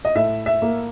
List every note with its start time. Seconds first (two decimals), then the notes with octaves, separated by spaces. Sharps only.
0.05 D#5
0.15 A2 E5
0.46 E5
0.62 A#3